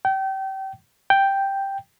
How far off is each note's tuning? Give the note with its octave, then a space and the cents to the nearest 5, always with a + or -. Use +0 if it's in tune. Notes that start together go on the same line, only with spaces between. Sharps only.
G5 -30
G5 +0